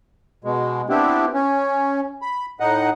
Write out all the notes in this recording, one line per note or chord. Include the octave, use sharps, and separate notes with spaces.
B2 G#3
B3 C4 D4 E4 G4
C#4
B5
A2 D#4 D#5 F#5